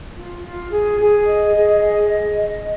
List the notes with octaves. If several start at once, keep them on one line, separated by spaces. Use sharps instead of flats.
F4
F4
G#4
G#4
D#5
G#4
D#5
D#5
D#5